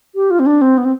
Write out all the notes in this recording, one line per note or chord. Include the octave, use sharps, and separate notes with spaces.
G4
F4
C4
D4
C4
B3
C4